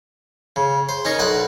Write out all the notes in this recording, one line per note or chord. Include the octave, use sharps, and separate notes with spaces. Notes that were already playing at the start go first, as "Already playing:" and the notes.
C#3
C5
C#4 D#4 A#4
B1 D5 F#5